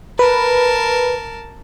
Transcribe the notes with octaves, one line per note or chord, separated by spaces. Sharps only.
A#4 B4 A5